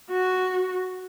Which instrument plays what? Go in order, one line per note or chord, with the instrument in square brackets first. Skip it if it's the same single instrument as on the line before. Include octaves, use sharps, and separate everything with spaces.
[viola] F#4